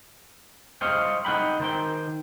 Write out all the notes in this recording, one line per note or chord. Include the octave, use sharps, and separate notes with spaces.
C5 C#5 D#5 F5 G5
D#4 F#5 G5 B5
D#3 C5 G5